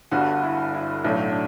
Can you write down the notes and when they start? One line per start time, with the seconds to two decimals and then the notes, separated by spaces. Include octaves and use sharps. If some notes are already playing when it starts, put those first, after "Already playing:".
0.11 G1 G2 D3 F#4
0.43 E4
0.74 E4
1.04 B1 A2 F#3 A3 D4
1.32 D4